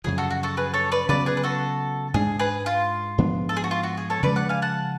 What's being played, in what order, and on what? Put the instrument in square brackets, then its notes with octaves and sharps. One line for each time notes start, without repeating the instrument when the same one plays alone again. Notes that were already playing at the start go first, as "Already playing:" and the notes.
[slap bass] F#2 C#3 F3 [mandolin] G#4
[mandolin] F#4 A4
F#4
F#4 A4
G#4 B4
A4 C#5
B4 D5
[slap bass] C#3 F#3 B3 [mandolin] B4 D5
[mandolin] G#4 B4
B4
F#4 A4
[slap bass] G#2 G#3 D4 [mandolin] G#4
[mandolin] G#4 B4
F4
[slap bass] G#2 F3 B3 D4
[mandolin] A4
G#4
F#4
F4
F#4
G#4
A4 C#5
[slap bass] C#3 F3 G#3 [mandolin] B4 D5
[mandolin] D5 F#5
F5 G#5
F#5 A5